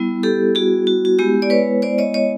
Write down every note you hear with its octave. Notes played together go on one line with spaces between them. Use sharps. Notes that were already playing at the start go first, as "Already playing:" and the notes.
Already playing: G3 B3 E4
G4 A4
F#4 G#4
F#4
F#4
G#3 B3 E4 G4
D5
B4 C#5
C5 D5
C#5 D#5
C#5 D#5